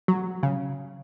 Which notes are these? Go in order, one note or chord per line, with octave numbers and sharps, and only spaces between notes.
F#3
C#3